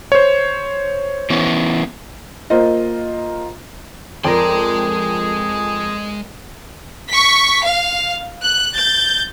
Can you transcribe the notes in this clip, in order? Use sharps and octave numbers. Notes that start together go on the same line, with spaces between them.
C5 C#5
E3 B3 C#4
A#3 F4 C5 D#5
F2 G#3 G#4 A#4 D5 G5 C6
C#6 B6
F5
F#6
G6 A6